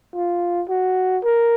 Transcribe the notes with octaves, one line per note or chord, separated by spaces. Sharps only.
F4
F#4
A#4